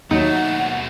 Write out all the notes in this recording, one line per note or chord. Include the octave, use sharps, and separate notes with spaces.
D#2 B2 F#3 A3 D#4 F#5